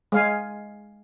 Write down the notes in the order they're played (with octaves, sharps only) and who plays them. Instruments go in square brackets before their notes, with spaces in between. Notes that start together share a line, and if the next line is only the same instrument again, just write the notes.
[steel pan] G#3 F5 G#5